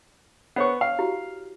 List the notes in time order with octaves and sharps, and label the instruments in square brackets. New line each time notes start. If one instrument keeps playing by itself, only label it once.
[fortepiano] B3 C#6 [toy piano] C5 C#5 F#5
[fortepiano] F5
[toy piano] E4 F#4 G4